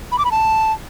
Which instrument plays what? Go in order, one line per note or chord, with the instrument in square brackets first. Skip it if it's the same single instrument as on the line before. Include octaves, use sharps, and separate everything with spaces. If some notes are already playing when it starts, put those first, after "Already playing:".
[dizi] B5
D6
B5
A5